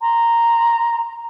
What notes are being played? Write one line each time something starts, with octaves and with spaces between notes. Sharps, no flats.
A#5 C6